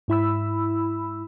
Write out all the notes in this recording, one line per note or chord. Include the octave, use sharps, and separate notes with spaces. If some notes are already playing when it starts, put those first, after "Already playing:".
G#2 E4 B5 E6